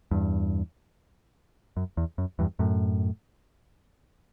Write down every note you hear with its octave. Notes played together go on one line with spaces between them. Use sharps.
E2 G2
F#2
E2
F#2
E2 G2
F#2 A2